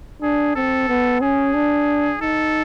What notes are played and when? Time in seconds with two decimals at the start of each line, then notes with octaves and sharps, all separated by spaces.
0.22 D4 G#4
0.55 C4 A4
0.89 B3
1.21 C#4 G#4
1.54 D4
2.21 D#4 A4